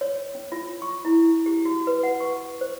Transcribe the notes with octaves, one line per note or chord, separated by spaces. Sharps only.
C#5
C#4
F4
C#6
E4
G4
F#4
B4
F#5
C#6
C5